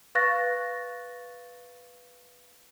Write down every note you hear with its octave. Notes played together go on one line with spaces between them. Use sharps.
B4 F5 C#6 F#6 A6 A#6